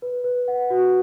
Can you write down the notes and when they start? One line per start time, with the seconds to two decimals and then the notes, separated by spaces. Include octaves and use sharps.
0.02 B4
0.24 B4
0.48 F#5
0.70 F#4